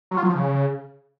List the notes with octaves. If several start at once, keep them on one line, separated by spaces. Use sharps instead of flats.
F#3
F4
F#3
F3
C#3